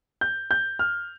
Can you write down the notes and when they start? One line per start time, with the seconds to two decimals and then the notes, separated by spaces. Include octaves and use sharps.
0.21 G6
0.51 G6
0.79 F6